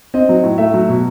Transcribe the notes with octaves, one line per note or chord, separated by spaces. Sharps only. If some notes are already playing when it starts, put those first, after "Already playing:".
C4 D#5
F#3
A2
A3 E5
F#3
B2